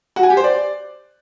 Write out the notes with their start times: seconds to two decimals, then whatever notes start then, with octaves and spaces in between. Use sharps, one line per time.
0.16 F#4
0.23 G#5
0.30 G4
0.37 C5
0.44 D5